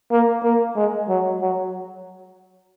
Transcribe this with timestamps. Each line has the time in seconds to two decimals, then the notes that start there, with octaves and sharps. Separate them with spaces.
0.11 A#3
0.43 A#3
0.76 G#3
1.09 F#3
1.42 F#3